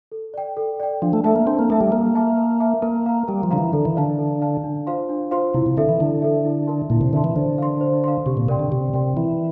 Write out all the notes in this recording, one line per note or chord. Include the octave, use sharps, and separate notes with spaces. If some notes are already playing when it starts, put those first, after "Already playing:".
A4
D5 G5
A4
D5 G5
F3 D4
A3
A3 A4 E5 A5
A#3
C4 D4
A#3
A3 A4 E5 A5
G3
A#3 A#4
E5 A5 D6
A#4
E5 A5 D6
A#3 A#4
F5 A#5
G3 A#4
F3
D3 F5 A#5
E3
D3 A4
E3
D3 D5 F5 A5
A4
D5 F5 A5
D4
F4 C5 F5 C6
D4
F4 C5 F5 C6
C3 E4
C3
D3 A4 E5
E3
D3 E4
A4 E5
E4
A#4 E5 A5 C6
A#2 E4
C3
D3 A#4 E5 A5 C6
E3
D3 C5
F5 C6
C5
F5 C6
C3 G4
A#2
C3 A#4 D5 G5 C6
D3
C3 G4
C3 A#4 D5 G5 C6
E3 E4